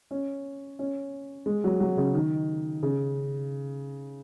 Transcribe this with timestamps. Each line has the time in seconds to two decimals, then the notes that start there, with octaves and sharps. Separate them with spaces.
0.11 C#4
0.79 C#4
1.46 G#3
1.64 F#3
1.80 F#3
1.97 C#3
2.14 D#3
2.83 C#3